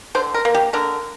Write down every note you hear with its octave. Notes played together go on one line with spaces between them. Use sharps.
D3 C5
A#4
A#3
G4
D3 A#4